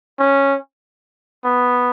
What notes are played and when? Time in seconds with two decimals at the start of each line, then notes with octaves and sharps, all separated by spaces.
0.19 C#4
1.44 B3